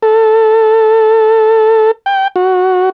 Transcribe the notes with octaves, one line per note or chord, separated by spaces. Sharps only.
A4
G5
F#4